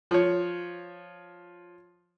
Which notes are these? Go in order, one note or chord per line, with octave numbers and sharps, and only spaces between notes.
F3 C#5